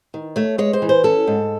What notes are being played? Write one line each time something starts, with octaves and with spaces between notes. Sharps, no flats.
D#3
A3 C#5
G#3 C#5
C5
E3
C5
C#4 A4
G#2